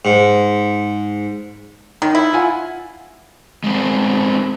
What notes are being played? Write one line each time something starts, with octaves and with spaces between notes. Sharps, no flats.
G#2
D#3 D#4
E4
F4 F#5 G#5
G#3 A3 C4 C5